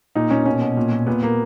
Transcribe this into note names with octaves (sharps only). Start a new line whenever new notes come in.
A#2 D#4
A#2 C#4
B2 C#4
B2
A#2
A#2
A#2 B3
A#2 A#3